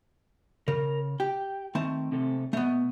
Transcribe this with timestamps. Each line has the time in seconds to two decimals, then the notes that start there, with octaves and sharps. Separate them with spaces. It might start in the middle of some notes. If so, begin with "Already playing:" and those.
0.68 C#3 A#4
1.20 G4 G5
1.75 D#3 A3 C4 A5
2.12 C3 A4
2.53 B2 A3 B3